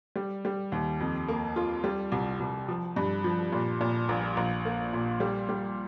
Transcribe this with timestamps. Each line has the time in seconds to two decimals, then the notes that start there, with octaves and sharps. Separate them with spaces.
0.16 G3
0.45 G3
0.72 D#2
1.00 F2
1.28 A#3
1.56 F4
1.84 G3
2.12 C2
2.40 C2
2.68 F3
2.96 G2
3.24 F3
3.52 A#2
3.81 A#2
4.09 A#1
4.37 A#1
4.65 A#3
4.93 A#2
5.20 G3
5.49 G3